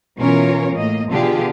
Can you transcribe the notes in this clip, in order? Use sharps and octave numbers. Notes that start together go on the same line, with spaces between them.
B2 E3 C#4 F4 A#4 C#5
A2 A#3 D#5
B2 D3 E3 F4 G4 G#4